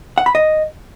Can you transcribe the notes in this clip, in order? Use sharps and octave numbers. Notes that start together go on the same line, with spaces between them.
F#5
B5
D#5